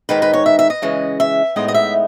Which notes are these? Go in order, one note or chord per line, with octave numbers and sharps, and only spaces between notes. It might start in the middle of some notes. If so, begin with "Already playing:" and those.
G#2 D#3 G#3 D#4 B4
B4
C#5
E5
E5
D#5
C#3 E3 G#3 C#4
E5
A2 G#3 B3 D#4 D#5
D#5
E5